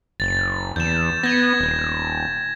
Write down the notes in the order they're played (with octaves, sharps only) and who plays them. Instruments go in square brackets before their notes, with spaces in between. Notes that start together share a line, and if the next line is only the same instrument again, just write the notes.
[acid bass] F#1 [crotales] A6
[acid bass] E2 [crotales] G6 E7
[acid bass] B3 [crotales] G#6 A#6
[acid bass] D#1